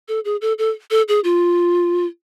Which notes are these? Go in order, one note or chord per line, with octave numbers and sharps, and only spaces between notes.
A4
G#4
A4
A4
A4
G#4
F4